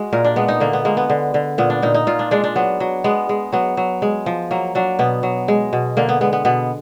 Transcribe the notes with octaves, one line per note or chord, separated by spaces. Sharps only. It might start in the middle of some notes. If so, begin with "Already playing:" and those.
Already playing: G#3 F#4
A#2 A#4
D4
G#3 B3
D#4
D3 A#3
B3
G#3 A#3
B3
D3
D3
A#2 B3
D4
A#2 D#4
D#4
A#2 F4
D4
G#3 D4
D4
F#3 B3
F#3
G#3 B3
G#3
F#3 B3
F#3
G#3
F3
F#3 A#3
F#3 D4
B2 B3
F#3
G#3
B2
D3 A#3
B3
G#3 B3
B3
B2 B3